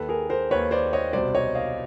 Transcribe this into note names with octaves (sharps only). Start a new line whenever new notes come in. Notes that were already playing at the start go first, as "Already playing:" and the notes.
Already playing: D#2 D#3 A4 B4
G#4 A#4
A#4 C5
D#2 D#3 B4 C#5
C5 D5
C#5 D#5
C2 B2 C5 D5
C#5 D#5
D#5 F5